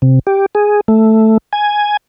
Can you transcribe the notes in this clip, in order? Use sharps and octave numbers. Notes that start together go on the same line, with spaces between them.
C3
G4
G#4
A3
G#5